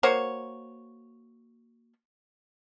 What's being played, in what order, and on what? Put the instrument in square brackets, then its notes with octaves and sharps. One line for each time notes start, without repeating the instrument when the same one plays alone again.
[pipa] A#3 F#4 C5 C#5